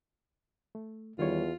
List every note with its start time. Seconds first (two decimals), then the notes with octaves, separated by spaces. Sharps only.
0.75 A3
1.19 E2 D#3 G3 F4 C#5